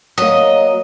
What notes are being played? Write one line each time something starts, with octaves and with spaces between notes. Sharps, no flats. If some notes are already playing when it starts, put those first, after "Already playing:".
F#3 A#3 D#5